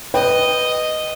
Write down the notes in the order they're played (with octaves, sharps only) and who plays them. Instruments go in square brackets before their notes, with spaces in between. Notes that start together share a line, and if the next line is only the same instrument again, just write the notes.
[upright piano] B4 G5 [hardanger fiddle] D#5